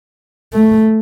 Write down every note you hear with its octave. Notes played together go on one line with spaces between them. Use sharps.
A3